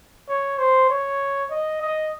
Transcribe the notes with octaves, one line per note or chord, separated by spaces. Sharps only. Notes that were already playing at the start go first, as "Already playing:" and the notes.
C#5
C5
C#5
D#5
D#5